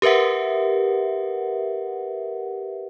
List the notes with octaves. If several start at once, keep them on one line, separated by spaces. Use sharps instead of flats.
G4 A#4 B4 E5 F#5